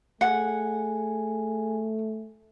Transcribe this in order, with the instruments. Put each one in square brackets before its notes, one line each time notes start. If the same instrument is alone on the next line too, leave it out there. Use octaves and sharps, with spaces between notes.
[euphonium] A3 [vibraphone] G#4 G#5 [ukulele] F#5